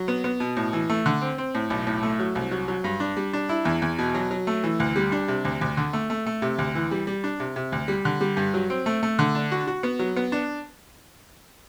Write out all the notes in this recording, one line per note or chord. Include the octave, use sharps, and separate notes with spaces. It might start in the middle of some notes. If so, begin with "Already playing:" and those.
Already playing: F#3
B3
B3
B2
A2
E3
A3
D3
C4
C4
A2
B1
A2
A3
F#3
C2
F#3
F#3
G2
D4
G3
D4
E4
E2
E2
B2
F#3
F#3
A3
E3
D2
G3
D4
C3
D2
D2
D3
A3
A3
A3
C3
D2
E3
G3
G3
D4
C3
C3
D2
G3
D3
G3
G2
F#3
C4
A3
A3
D3
D4
F#4
F#4
B3
F#3
B3
D4